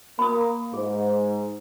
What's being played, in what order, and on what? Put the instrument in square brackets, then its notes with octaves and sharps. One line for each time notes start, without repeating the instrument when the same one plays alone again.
[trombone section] A#3 [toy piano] B5 D#6
[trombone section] G#2 [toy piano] G#4